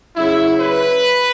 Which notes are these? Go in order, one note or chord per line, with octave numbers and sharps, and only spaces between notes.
C#3 F#3 E4
B4